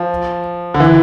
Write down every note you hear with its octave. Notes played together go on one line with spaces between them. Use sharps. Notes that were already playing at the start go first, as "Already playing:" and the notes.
Already playing: F3
D3
E3